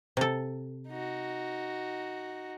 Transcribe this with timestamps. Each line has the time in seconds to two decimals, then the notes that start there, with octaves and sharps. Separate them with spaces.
0.17 C3 A4
0.89 D#4 F#4